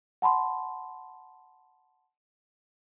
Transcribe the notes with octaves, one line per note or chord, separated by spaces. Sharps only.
F#5 A5 B5 C6